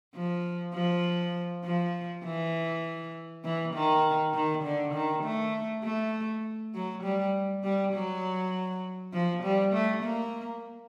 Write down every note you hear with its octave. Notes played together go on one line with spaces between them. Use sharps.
F3
F3
F3
E3
E3
D#3
D#3
D3
D#3
A3
A3
F#3
G3
G3
F#3
F3
G3
A3
A#3